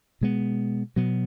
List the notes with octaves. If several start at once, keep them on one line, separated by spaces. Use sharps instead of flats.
B2 G#3 B3
B2 F#3 B3